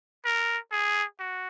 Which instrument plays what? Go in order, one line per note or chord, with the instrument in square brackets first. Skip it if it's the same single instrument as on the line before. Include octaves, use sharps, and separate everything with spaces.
[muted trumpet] A#4
G#4
F#4